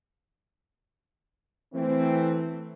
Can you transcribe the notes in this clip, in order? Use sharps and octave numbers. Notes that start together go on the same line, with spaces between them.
E3 A3 C4